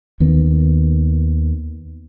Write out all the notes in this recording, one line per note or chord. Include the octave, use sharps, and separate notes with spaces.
D#2 D#3 B3